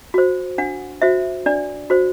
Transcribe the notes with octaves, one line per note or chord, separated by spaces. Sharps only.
F#4 C5
D4 F#5
F#4 C5 E5
D4 D5
F#4 C5